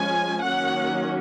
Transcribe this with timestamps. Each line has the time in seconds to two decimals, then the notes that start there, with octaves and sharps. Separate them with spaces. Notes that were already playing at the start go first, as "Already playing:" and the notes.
Already playing: F3 G#3 C#4 G#5
0.44 D#3 F#3 A#3 C#4 F#5